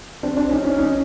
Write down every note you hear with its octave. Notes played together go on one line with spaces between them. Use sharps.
C4 D4
C4 D4
C#4 D#4
C#4 D#4
C#4 D#4